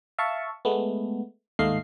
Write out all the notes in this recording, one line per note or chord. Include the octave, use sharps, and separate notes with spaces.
E5 F5 A5 C#6
G#3 A3 B3
D#2 G#2 A3 D#5 F5 C7